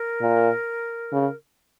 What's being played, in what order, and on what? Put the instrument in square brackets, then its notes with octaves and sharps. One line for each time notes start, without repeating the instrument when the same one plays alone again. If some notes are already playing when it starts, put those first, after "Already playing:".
Already playing: [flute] A#4
[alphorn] A#2
C#3